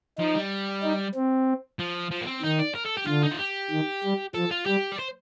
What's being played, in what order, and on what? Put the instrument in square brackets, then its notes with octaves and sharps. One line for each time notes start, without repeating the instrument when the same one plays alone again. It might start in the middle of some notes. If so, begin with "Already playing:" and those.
[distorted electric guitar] F3 [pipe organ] D#4
[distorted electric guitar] G3
[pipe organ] D#4
C4
[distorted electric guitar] F3
F3
A#3
C4
[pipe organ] D#3 [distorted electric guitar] D#4
[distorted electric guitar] D5
A#4
A4
G4
[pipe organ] D3 [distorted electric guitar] F4
[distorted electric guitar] D#4
F4
G4
[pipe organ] D#3
G3
[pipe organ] F3 [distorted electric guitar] A4
[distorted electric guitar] F4
[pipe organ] G3 [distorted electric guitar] G4
[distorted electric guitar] D5
C5